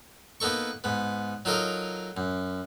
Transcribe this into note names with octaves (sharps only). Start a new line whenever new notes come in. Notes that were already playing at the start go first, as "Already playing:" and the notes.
A#3 B3 D#4 A4 C#6
G#2 B3
F#3 D#4 F4 A4 A#4 D#5
F#2